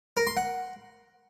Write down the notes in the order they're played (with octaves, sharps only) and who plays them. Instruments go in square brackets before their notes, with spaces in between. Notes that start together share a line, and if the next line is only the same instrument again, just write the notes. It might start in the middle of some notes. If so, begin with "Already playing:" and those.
[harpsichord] A#4
C6
F#5